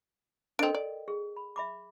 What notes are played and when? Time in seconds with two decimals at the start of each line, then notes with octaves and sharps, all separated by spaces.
0.59 C4 D4 A4 A#4 D#5 G5 D7
0.75 D5
1.08 G#4
1.36 B5
1.56 E5 B5 D6